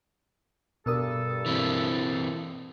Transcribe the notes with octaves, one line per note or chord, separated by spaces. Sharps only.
G2 B2 A4 A#4 D#6
E3 C4